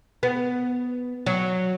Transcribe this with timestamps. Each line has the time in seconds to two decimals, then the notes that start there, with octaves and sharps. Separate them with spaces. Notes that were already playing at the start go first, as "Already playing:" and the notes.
0.23 B3
1.26 F#3